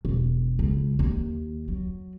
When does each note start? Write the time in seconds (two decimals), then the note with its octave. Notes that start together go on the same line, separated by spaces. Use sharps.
0.05 E1
0.59 C#2
0.99 D#2
1.68 F#3